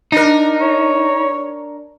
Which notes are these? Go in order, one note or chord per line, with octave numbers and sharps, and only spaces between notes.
D4 D#4 A#4
C#5